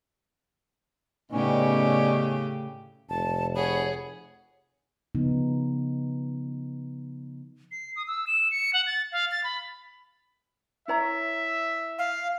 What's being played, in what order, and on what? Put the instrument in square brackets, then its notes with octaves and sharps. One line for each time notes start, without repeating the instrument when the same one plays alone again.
[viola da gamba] A2 C#3 G4 [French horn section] B3 D#4 D5 [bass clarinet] C#4
[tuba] F1 [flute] A5
[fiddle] G#4 F#5 [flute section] C#5 [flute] B5
[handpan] C#3 F3 B3 D#4
[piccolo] C7
D#6
E6
E7
C#7
F#5
A6
F5
A6
B5
[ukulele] E4 C#5 A#5 [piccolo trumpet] E5
[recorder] F5